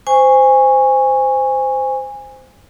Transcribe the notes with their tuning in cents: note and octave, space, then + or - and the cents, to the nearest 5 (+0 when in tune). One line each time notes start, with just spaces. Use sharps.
C5 -15 G#5 -20 C#6 +0